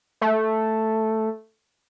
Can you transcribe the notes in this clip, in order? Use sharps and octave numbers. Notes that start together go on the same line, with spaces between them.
A3